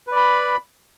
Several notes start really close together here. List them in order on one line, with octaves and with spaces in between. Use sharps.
B4 D5 B5